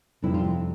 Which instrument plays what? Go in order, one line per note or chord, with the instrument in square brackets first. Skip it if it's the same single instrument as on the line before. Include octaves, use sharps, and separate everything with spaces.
[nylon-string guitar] F2 C3 G3 D4 E4
F4
E4